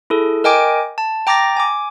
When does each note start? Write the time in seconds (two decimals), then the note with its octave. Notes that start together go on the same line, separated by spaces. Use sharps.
0.10 E4 G#4 A4
0.44 A#4 D#5 G5 G#5 D6 D7
0.98 A5
1.27 G5 A#5 D6 A6 A#6
1.57 G#5 D6